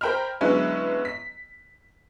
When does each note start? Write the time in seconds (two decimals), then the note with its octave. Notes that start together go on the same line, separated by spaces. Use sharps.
0.01 A#4 C5 G5 A#5 B5 F6
0.41 D3 F#3 G#3 B3 C#4 E4
1.05 B6